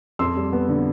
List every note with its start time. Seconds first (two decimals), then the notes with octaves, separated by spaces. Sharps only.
0.19 F2 C6 E6
0.37 G3
0.53 B3
0.69 D3